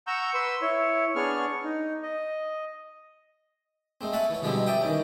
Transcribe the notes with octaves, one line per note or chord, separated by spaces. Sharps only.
F#5 A#5 C#6 E6 G6
B4 C6 E6
E4 C#5
B3 D4 G#4 C#5 C#6 F6
D#4
D#5
G#3 A3 C4
A3 A4 E5 F#5 G#5
E3 C#5
B2 D3 F3 G3 G#3 C4
D5 E5 G5 D#6
D#3 E3 C#4